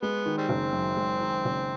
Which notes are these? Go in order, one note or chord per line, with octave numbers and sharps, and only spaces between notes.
G#3 B3
D#3
G3 C4
F#1
F#2
G#3
D#3
F#1